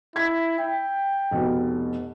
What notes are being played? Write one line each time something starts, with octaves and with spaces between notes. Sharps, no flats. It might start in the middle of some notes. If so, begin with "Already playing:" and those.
E4 G#6 B6
G5
F1 B2